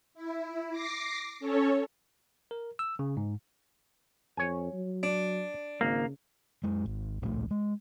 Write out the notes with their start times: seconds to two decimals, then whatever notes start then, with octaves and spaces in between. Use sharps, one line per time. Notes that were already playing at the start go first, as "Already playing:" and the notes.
0.14 E4
0.71 D6 A#6 C7
1.40 C#4 A4 C#5
2.51 A#4
2.79 E6
2.99 C#3
3.17 G#2
4.37 F2 C#5 G#5
4.73 F#3
5.03 D4
5.81 G#1 C#3 A#3
6.64 F#2 G#3
6.86 G#1
7.22 D1 A#1 A3
7.51 G#3